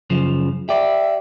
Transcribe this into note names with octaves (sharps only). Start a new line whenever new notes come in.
F#2 C#3 F3
G4 D5 E5